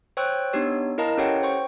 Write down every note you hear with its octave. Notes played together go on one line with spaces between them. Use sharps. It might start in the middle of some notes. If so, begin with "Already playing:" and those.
C5 C#5 G5 C#6 E6 F#6
B3 D4 D#4 G4 C#5
E4 A#4 D#5 F5 A5 A#5
C#4 G4 A4 C#5 F#5 G5
C5 G5 C#6